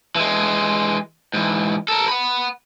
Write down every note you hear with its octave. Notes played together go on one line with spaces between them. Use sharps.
E3 G#3
G#2 E3
A4 A#4
F#5 B5